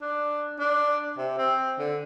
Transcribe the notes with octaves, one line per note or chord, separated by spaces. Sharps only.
D4
D4
C3
C4
D3